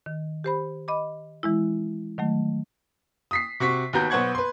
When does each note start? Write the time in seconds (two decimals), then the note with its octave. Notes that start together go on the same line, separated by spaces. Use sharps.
0.06 D#3
0.44 G4 C5 B5
0.88 D#5 B5 D6
1.43 E3 G#3 E4
2.18 D#3 F#3 A3
3.31 D#6 B6 C7
3.60 C3 F#4 C#6 B6
3.93 D#2 B3 F#4 A#5 G6
4.10 B1 B3 C5 F#5 C#6 G#6
4.35 B4 C6